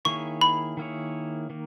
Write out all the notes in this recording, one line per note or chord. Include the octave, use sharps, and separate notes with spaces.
D#3 A#3 E4 G#4 C#5 C#6
B5
D#3 A#3 E4 G#4 C#5
D#3 A#3